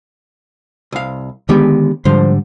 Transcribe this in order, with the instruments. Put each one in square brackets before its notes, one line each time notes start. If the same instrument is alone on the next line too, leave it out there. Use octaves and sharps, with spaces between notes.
[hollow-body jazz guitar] C2 F5
[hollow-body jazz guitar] D3 B3 G4 [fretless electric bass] D#3 G#3
[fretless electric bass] G#2 D3 G3 [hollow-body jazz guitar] F3 C5